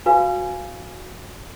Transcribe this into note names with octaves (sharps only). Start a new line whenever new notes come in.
F#4 B4 F5 G#5